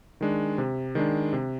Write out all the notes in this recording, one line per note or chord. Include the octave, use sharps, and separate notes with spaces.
D#3 G#3 D4
C3
D#3 G#3 D4
C3